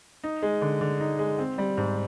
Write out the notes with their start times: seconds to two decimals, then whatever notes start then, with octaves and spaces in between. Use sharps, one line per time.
0.24 D#4
0.42 G#3
0.61 D3
0.81 D3
1.00 D#4
1.19 G#3
1.38 C4
1.58 G3
1.77 G#2